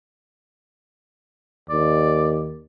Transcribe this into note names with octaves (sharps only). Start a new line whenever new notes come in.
D#2 D5